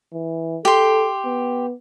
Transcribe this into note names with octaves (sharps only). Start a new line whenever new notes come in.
E3
G4 A4 C6
B3